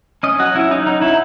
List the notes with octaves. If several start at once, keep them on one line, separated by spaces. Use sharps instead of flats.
C#4 D#5
F#3 F#4
C#4 E4
F#3 D#4
C#4 D#4
F#3 E4